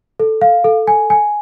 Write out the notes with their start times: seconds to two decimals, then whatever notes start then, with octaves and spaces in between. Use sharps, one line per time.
0.20 A4
0.41 F5
0.64 A4
0.87 G#5
1.10 G#5